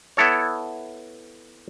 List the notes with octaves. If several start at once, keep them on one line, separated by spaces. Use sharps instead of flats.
B3 E4 A4 C#5